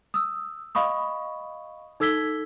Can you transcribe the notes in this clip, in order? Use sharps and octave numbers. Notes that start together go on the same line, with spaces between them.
D#6 E6
D#5 F5 B5 C#6 D#6
D#4 A4 E6 G#6 B6 G7